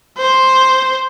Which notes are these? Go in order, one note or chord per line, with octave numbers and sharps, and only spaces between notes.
C5